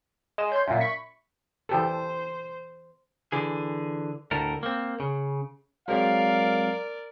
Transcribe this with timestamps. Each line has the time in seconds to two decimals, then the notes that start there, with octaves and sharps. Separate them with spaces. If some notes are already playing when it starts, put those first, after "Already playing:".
0.38 G#3 E7
0.52 C#5 C6 G6
0.67 F#2 A#2 E5
0.80 B5 C#6 B6
1.69 E3 G4 A4 C5
3.32 D3 E3 G#4
4.31 D2 A2 A4 A#4
4.63 A#3 C4
5.00 C#3
5.88 F#3 G#3 C4 A#4 D5 F5